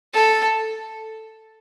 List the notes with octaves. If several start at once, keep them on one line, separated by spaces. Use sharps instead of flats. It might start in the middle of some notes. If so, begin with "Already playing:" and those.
A4